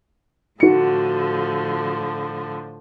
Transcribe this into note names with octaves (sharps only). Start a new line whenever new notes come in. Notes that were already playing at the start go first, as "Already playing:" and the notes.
A2 D3 F3 F#4 C#7